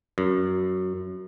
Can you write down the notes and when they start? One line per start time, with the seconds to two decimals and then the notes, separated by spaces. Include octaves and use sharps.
0.18 F#2